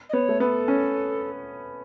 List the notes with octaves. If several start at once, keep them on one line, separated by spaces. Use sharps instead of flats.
D#5
B3 C#5
A3
B3 A4
C#4